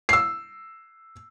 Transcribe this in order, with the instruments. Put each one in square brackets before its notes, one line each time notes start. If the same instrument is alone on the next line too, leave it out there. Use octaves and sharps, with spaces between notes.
[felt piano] E6 C7